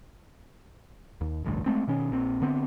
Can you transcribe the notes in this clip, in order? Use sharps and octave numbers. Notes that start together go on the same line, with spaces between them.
D#2
E1 A1 D2 G2
G#3 A3 C4
B2 D#3 C#4
A#1 A#2 C4
D3 B3 C4